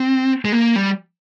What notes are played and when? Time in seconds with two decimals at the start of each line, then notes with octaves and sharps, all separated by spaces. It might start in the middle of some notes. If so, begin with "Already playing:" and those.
Already playing: C4
0.45 G#3
0.52 A#3
0.76 G3